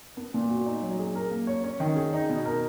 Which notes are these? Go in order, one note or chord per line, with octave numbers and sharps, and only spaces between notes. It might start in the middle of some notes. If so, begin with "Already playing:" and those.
B3
A#2
F#4
D#4
F#3
G#4
A#4
A#3
C#5
C#4
D#3
G#4
D#4
B2
A#4